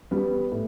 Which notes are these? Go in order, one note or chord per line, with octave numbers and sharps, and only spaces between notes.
G3 B3
A2